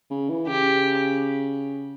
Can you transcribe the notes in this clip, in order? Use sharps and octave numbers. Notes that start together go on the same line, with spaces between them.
C#3
E3
C#3 G4